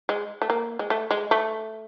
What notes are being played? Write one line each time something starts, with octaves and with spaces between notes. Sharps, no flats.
G#3
A3
A#3
G#3
A3
G#3
A3